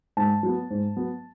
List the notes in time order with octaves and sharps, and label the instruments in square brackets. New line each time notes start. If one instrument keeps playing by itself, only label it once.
[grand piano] G#2 A5
F#3 B3
G#2
F#3 B3